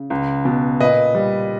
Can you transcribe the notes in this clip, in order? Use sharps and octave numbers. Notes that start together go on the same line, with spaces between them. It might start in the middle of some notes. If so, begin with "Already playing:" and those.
Already playing: C#3
C#2
B2
A#2 B4 D#5
G3